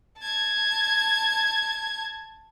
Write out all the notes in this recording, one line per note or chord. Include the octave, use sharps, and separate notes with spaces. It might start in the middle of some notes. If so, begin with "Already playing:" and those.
A5 G#6